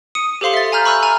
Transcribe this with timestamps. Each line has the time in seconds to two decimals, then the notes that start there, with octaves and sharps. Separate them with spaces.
0.15 D#6 C#7 D#7
0.41 G4 A4 C5 F5 C6 G7
0.54 E5 A6
0.72 G#5 A#5 F6 G6
0.85 B5 C#6 E6 F#6
1.03 G#5 A#5 F6